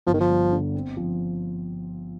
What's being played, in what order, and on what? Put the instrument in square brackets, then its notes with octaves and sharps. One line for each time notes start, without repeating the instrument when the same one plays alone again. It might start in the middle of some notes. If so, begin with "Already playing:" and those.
[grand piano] G1 [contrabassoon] F3
[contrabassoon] D#3
F3
[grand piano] G3
D3
C4
F3